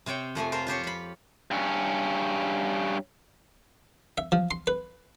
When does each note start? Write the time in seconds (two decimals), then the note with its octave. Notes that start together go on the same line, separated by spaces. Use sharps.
0.06 C3 C4 C#5 G5
0.35 F2 F3 A3 G#5
0.52 F4 A#4 C5
0.67 F4 G4 C5 C#5
0.83 C#5 B5
1.51 G2 C#4
4.18 E5
4.32 F3
4.51 C6
4.67 B4